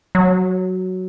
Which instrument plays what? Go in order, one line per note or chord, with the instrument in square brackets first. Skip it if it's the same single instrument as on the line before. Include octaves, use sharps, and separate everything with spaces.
[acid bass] F#3